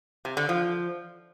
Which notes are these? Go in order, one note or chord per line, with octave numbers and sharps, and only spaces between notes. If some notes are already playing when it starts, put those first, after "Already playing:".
C3
D3
F3